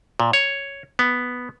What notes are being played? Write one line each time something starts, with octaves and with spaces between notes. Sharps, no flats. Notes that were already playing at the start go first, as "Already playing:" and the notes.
A#2
C#5
B3